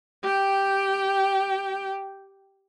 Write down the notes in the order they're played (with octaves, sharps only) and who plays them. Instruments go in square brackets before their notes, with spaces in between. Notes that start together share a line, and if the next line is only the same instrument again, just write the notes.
[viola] G4 G5